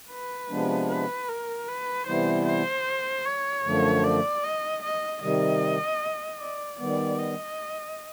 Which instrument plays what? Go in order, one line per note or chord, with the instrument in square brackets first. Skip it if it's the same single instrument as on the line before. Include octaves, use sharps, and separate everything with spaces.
[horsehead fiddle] B4
[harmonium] C3 F3 G#3 B3 D4
[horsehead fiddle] B4
A#4
B4
[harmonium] C3 E3 G3 B3 E4 [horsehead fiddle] C5
[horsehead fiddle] C5
C#5
[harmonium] F#2 D3 F3 A3
[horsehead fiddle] D5
D#5
D#5
[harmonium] C3 D#3 G3 [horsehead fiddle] D#5
[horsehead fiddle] D5
[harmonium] D#3 G3 B3 [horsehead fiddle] D5
[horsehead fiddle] D#5